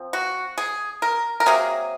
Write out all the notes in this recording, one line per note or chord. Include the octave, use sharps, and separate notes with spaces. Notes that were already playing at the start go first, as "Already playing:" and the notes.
Already playing: F3 C4
F#4
G#4
A#4
A#4
C3 F#3 A#3 G#4